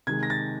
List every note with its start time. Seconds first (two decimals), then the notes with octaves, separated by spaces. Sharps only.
0.07 C3 D#3 G#3 G#6
0.23 A#6
0.30 A6